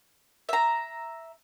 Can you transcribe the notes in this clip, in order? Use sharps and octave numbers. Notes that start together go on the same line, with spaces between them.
E5 A#5